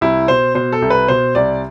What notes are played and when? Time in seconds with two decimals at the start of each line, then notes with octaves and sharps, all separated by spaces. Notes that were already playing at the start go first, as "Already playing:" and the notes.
0.01 C2 E4
0.28 B2 C5
0.55 B2 C5
0.72 A4
0.82 C2
0.90 B4
1.08 B2 C5
1.35 C2 D5